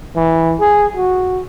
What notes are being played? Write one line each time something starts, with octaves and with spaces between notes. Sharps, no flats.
E3
G#4
F#4